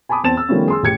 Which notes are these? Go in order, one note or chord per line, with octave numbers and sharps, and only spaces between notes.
G#5 A5 B5 D6 D#6
E2 C4 A5 A6 E7
E6
D#3 F3 G3 A3 B3 C#4
G#4 C6 E6
A1 G4 G#6 C#7